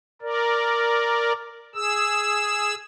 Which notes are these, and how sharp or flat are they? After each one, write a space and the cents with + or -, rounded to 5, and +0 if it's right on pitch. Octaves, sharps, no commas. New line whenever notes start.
A#4 +0 D5 +0
G#4 +0 E6 +0